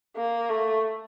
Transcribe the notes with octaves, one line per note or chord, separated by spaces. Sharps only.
A#3
A3